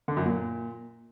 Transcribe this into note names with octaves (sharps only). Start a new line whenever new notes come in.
D3
F#2
A#2